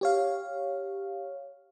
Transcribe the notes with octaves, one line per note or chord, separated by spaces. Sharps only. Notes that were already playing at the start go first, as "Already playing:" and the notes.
G4 C#5 F5